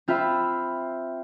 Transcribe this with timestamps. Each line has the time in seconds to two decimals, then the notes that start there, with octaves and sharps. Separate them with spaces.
0.08 C4 F4 C5 E5 B5